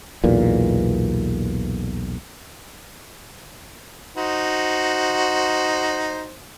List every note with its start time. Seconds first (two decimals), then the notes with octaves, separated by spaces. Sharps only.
0.24 B1 E2 A#2
4.17 D#4 F#4 C5